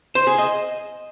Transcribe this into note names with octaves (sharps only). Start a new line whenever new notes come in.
C5
G#4
D#5